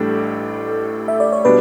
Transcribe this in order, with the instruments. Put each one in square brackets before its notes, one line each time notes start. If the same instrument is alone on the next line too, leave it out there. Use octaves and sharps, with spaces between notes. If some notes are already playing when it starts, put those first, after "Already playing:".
Already playing: [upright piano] A1 A2 G3 D4 [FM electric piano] A4
[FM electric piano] E5
D5
C#5
[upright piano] B2 G3 D4 [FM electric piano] B4